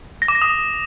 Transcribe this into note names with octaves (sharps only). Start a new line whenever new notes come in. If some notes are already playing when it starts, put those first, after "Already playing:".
A#6
D6
A#6
D#6